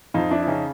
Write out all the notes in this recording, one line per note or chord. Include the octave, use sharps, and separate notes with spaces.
F2 D#4 F4
D4 E4
E4
C#3 C#4 D#4